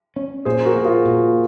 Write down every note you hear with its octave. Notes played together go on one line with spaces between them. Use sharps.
C#4
A#2 G#4 C5
F#4 A#4
A#3
F4 G#4
A#2